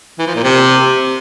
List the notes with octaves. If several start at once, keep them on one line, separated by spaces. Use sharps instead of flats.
E3
F3
A#2
C3